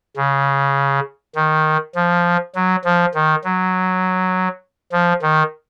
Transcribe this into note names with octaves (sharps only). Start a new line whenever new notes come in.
C#3
D#3
F3
F#3
F3
D#3
F#3
F3
D#3